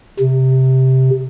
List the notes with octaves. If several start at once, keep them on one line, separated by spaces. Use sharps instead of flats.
C3